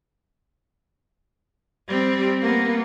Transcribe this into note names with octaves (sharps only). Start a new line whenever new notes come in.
G3 C4
A#3 B3